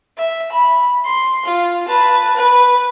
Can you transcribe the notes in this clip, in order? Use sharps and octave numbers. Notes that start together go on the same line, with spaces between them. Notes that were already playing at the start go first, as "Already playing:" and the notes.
E5
B5
C6
F4
B4 A5
B4